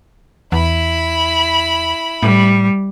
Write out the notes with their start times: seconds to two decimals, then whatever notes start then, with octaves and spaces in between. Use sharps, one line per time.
0.52 E2 E4 B5
2.23 A2 G3